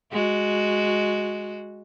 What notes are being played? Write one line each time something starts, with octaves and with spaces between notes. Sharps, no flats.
G#3 F#4